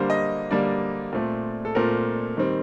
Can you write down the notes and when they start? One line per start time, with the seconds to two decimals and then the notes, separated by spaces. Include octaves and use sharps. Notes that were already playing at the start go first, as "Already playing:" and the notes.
Already playing: D3 G3 A#3 C5
0.10 D#5
0.51 D3 G3 A#3 D5
1.13 A#2 A3 C4
1.65 A4
1.75 A#2 A3 C4 A#4
2.37 D#3 G3 C4